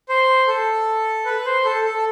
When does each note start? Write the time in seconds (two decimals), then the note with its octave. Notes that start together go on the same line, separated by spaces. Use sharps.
0.09 C5
0.47 A4
1.25 B4
1.46 C5
1.65 A4
1.84 A4